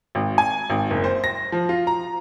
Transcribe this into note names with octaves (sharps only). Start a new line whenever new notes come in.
G#1
G#5
G#1
F#1
C5
A#6
F3
F4
A#5